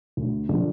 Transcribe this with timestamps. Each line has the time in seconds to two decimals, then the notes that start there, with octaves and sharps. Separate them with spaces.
0.17 D2
0.49 D3 F3